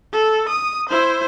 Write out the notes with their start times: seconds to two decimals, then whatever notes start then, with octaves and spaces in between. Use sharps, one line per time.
0.13 A4
0.49 D#6
0.89 E4 C5